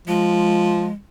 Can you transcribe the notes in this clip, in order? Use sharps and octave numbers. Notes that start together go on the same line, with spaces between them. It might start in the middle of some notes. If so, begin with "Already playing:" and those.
F3 G#3